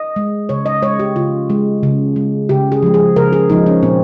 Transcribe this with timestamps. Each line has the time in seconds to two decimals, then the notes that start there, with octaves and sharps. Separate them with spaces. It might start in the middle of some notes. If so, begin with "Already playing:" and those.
Already playing: D#5
0.16 G#3
0.49 C#3 C#5
0.66 D#5
0.82 G#3 C#5
1.00 G4
1.16 C#3 F4
1.50 G#3
1.83 C#3
2.16 G#3
2.49 C#3 G4
2.72 G#4
2.83 F3 G#3
2.94 G#4
3.16 C#3 A#4
3.33 G#4
3.50 F3 G#3 D#4
3.66 C#4
3.83 A#2 C4